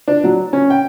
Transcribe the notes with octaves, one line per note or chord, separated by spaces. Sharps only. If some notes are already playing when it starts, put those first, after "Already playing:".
D4
F#3
C#4
G5